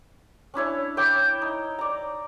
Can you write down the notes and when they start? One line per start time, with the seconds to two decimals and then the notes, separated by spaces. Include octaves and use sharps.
0.54 C#4 D4 E4 C#5
0.97 C#5 E5 G5 D6
1.42 D#4
1.79 D5 A#5